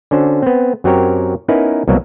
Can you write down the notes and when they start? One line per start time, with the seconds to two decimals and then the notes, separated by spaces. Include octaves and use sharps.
0.11 D3 C#4 D4 F#4 C5
0.42 B3 C4
0.84 F#2 F#3 C4 G4 A#4 C#5
1.48 B3 C#4 D#4 E4 A#4 B4
1.88 C2 B2 F#3 A#3